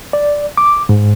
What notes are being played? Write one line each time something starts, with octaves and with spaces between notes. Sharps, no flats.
D5
D6
G#2